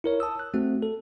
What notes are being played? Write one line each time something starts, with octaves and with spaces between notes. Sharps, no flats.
E4 A#4 C#5
A5 D#6 E6
F#6
A3 C4 F#4
A4